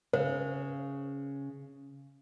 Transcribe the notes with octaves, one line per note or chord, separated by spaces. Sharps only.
C#3 C5